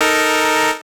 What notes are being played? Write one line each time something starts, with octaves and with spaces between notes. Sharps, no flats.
D#4 A4 A#4